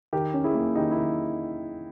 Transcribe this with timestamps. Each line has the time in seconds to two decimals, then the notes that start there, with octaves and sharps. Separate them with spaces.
0.13 D#3 G4 A#4
0.34 C#4
0.44 E4 G#4
0.54 A#3
0.75 D#3 D#4 G4
0.91 E4
0.96 D#3